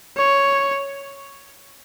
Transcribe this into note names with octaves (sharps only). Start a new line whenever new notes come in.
C#5